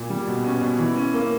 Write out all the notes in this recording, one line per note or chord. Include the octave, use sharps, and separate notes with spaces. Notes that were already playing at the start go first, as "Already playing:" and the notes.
Already playing: A#2
G3
B2
C#4
B2
E3
C#4
A#3